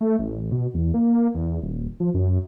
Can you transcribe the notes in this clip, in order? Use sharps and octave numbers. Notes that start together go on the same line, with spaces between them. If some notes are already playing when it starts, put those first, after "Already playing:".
A3
A1
B2
E2
A#3
E2
D#1
F3
F#2